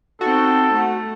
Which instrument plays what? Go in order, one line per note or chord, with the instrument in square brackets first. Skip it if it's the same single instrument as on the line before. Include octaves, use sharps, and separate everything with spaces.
[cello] C4 D#4 [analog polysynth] F#4 [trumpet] A4
[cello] A3